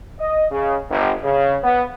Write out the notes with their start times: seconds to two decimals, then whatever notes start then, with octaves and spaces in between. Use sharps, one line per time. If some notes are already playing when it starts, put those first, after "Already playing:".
0.19 D#5
0.51 C#3
0.90 G1
1.24 C#3
1.64 B3